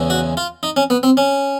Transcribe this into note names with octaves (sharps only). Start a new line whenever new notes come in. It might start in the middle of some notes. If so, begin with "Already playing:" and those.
Already playing: E2 C#3 E3 G#3
F#4
F4
D#4
C#4
B3
C4
C#4